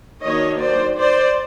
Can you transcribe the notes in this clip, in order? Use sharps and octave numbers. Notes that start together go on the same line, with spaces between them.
D#3 F#3 A#3 D4 C#5 D#5
C5 D5
C5 D5